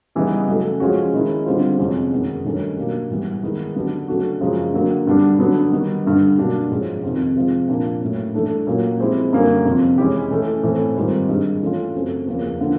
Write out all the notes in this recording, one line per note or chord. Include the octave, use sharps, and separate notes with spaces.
C#3 E3 G3 B3 D#4
C#3 F#3 A3
F3 G#3 C#4 F#4
D#3 G#3 C#4 E4
D3 G3 C4 F4
F2 C3 E3 G#3 C#4
F#2 D#3 G#3 B3
G2 D#3 F#3 A3 C#4
B2 F#3 A#3 D4 G4
G#2 E3 G3 B3
D#3 G#3 B3 E4
D3 F#3 B3 D4 G4
C#3 F#3 A3 D4 F#4
F#2 C#3 F3 G#3
D3 F#3 A#3
G2 D3 G3 B3 D4
D3 F#3 B3 D4
D#3 G3 B3
G2 D3 G3
B2 F#3 A#3 D4 G4
G#2 F3 G#3 C#4
F2 C3 D#3
C3 F3 G#3
A#2 F3 A#3 D4
A2 F#3 A#3 C#4
G2 E3 A3 D4
A#2 F#3 A#3 C#4
F3 G#3 C4 E4 G4
F#2 D3 G3 A#3
F2 C3 F3
E3 G#3 C#4 E4 G4
E3 A3 C#4
A2 E3 A3 C4 E4
G#2 D#3 G3 C4 F4
G2 D#3 G#3
E3 A3 C#4 F4
F#2 C#3 F#3 A3 C4
E2 C#3 F3 A#3 C#4
D3 F3 A#3 D4